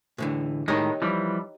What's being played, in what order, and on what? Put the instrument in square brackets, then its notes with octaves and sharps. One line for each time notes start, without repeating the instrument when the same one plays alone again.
[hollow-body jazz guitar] A2 D3 E3
[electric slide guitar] A2 D#3 G#3 [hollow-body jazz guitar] D#4 G4 C#5
[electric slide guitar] E3 F3 G3